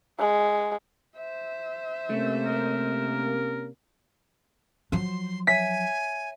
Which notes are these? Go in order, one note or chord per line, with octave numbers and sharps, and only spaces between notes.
G#3
C5 E5
C3 A3 A#3 C#4
A#4
F3 F#3 C6
C#5 E5 G#5 B6